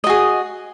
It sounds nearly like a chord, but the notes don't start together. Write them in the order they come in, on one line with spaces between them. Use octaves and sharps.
D#5 F#4 G#4